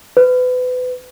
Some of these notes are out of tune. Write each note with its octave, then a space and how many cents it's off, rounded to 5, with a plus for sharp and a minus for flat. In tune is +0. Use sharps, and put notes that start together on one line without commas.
B4 +30